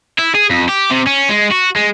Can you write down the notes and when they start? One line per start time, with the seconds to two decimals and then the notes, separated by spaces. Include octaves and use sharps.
0.19 E4
0.35 G#4
0.51 F2
0.69 G4
0.91 C3
1.07 C#4
1.29 G#3
1.51 F#4
1.76 G#3